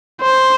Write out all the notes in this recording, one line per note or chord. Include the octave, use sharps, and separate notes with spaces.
C5